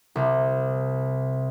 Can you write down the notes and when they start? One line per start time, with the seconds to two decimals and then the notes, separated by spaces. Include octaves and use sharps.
0.16 C2